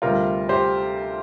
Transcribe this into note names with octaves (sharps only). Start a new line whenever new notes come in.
D2 C3 G3 F4 A#4
G4 C5